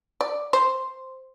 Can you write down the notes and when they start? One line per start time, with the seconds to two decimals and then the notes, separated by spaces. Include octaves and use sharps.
0.21 D5
0.53 C5